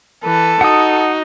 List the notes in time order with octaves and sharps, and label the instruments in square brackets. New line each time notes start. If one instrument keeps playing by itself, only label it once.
[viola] E3 B4 [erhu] A4
[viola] D#4 F#4 [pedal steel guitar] F#5 D#6